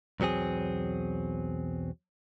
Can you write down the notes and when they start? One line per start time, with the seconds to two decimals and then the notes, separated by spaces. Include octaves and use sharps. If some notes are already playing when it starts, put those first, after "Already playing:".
0.20 B1 E2 F#3 C4 G#4